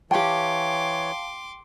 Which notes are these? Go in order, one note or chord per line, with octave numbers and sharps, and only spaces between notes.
E3 G4 C#5 F5 G5 A5 C6 D6